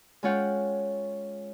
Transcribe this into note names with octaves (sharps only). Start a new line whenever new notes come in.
G#3 C#4 F4 C#5 F#5 G5